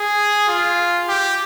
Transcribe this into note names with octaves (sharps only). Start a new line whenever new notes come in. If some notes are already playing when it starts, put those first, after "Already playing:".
Already playing: G#4
F4
G4